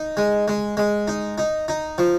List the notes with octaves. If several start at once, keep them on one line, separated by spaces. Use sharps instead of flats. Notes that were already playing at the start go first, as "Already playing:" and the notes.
Already playing: D#4
G#3
G#3
G#3
D#4
D#4
D#4
F3